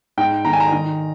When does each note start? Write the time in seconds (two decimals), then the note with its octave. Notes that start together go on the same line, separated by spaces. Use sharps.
0.18 G#2 G5
0.45 D#3 A#5
0.53 G#5
0.60 A#5
0.72 D#3